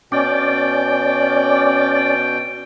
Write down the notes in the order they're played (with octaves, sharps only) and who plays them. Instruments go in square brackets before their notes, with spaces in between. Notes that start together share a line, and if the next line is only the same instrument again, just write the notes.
[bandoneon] B2 G5 [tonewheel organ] C#4 D5